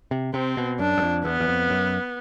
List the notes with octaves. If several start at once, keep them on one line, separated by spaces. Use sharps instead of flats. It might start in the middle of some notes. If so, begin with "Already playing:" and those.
C3
C3 C4
B2
F#2 D4
F#2
F2
E2 B3
E2
F2
F#2